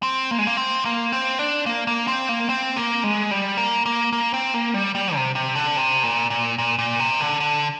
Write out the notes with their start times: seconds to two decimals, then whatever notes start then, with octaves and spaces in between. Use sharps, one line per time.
0.03 C4
0.31 A#3
0.39 G#3
0.47 A#3
0.57 C4
0.85 A#3
1.12 C4
1.39 D4
1.66 A#3
1.87 A#3
2.08 C4
2.29 A#3
2.49 C4
2.76 A#3
3.04 G#3
3.31 G3
3.57 A#3
3.86 A#3
4.13 A#3
4.34 C4
4.54 A#3
4.74 G3
4.95 G3
5.15 C3
5.35 C3
5.55 D3
5.77 C3
6.03 A#2
6.30 A#2
6.58 A#2
6.79 A#2
7.00 C3
7.20 D3
7.40 D3